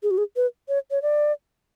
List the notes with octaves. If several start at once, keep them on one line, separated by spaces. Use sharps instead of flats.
G#4
F#4
G#4
B4
C#5
C#5
D5